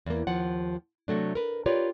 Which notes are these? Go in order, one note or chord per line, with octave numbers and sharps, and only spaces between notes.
E2 A#3
D#2 F3 F#5
C3 F#3 A3 D4
A#4 B4
F4 G4 A#4 B4 C#5 D5